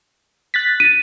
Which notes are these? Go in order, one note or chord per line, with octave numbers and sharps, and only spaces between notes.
F#6 A6 B6
D#7